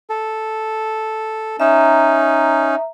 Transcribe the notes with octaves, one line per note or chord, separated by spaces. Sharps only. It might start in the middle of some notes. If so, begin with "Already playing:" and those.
A4
C#4 D#4 E5 A#5